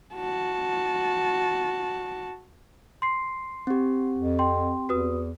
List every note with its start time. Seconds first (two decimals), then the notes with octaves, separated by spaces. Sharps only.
0.15 F#4 A5
3.02 C6 C7
3.67 C4 G4
4.18 F2
4.39 G5 C6
4.89 E2 F#4 B4 D#6